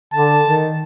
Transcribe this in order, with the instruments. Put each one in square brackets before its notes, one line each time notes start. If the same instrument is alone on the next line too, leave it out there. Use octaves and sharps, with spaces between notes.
[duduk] D3 [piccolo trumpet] A5
[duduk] D#3